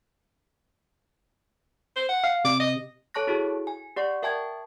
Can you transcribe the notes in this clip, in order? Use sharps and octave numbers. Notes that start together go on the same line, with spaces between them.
C5
F#5
F5
C3 D6
D#5
A4 C#5 A5 C#6 F#6 A#6
E4 F#4 G#4
G#5
G4 D5 F#5 C#6
A#4 E5 G5 A5 C#6 G#6